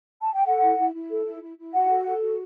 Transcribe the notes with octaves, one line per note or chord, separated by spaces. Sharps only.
A5
G5
A4 F#5
E4
E4
E4
A4
E4
E4
E4
F#4 F#5
A4
A4
F#4